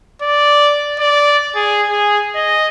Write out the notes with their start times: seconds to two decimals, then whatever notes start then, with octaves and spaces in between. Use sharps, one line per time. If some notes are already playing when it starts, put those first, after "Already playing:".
0.22 D5
0.99 D5
1.55 G#4
1.90 G#4
2.35 D#5